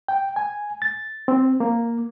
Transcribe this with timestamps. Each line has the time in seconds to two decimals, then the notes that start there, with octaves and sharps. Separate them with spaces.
0.08 G5
0.36 G#5
0.82 A6
1.28 C4
1.60 A#3